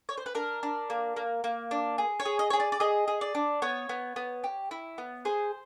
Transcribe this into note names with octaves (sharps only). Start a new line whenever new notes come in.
C#5
C5
B4
D4 A#4
D4
A#3
A#3
A#3
D4
G#4
C#5
G#4
D#5
G#4 C#5
D5
D5
G#4 D#5
G#4
D5
D4
B3 C#5
B3
B3
G4
E4
B3
G#4 C5